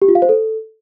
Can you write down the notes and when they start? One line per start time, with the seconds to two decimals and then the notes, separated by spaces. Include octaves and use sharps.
0.02 G4
0.08 F4
0.15 F5
0.22 C5
0.29 A4